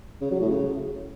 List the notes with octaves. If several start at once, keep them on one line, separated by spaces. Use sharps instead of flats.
C#3
F#3
A2
C#3